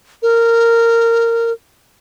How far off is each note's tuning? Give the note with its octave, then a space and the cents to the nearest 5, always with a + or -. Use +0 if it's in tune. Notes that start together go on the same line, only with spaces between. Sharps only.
A#4 -15